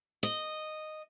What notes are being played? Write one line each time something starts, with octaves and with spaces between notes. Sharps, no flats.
D#5